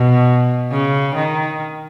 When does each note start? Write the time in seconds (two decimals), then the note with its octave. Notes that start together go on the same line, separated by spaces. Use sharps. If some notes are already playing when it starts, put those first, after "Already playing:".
Already playing: B2
0.71 C#3
1.15 D#3